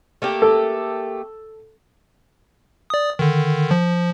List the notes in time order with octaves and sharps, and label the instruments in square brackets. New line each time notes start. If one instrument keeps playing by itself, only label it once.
[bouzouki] A3 A#3 G4
[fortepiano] A4
[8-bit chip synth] D5 D#6
D3 D#3
F3